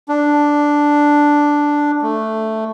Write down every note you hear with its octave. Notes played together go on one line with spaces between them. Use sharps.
D4
A3